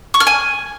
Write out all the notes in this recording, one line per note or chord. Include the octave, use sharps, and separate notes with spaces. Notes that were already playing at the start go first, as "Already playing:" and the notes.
C#6
F6
G#5